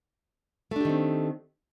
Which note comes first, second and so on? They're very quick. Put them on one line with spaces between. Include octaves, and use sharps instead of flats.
A3 D4 G4 D#3 C4